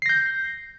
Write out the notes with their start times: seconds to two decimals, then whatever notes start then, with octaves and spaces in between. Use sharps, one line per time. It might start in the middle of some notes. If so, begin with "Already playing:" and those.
0.02 C7
0.06 A#6
0.09 G6